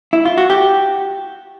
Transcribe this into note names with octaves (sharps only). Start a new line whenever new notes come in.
E4
F4
F#4
G4